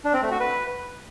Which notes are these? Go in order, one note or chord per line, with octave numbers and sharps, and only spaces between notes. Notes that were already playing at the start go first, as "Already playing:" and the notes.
D4
C4
A3
F#4
B4